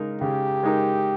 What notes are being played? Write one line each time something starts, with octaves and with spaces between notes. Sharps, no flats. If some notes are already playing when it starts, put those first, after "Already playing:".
Already playing: C#3 G#3 D#4 A#4
C#3 G4
G#3 D#4 A#4